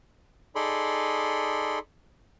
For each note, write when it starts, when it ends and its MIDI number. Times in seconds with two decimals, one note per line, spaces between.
0.55 1.79 63
0.55 1.79 68
0.55 1.79 69
0.55 1.79 74
0.55 1.79 83
0.55 1.79 84